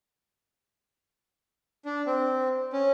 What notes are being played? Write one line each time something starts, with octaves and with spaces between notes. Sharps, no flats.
D4
C4
C#4